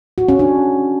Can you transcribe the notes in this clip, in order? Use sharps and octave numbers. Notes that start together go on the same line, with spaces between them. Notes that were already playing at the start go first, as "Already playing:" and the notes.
F#4
C#4
D4